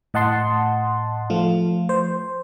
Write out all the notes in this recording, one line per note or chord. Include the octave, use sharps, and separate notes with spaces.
A2 D#5 F#5 A5 C6
F3 A3 F4
C5